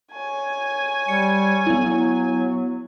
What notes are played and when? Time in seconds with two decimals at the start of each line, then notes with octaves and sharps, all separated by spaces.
0.12 C#5 G#5
1.08 G3 C#7
1.67 F#3 B3 E4